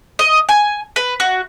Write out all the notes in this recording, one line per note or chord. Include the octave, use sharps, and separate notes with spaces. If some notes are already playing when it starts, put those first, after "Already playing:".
D#5
G#5
B4
F#4